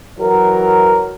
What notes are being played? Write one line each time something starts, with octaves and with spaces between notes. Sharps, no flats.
E3 F#3 A#4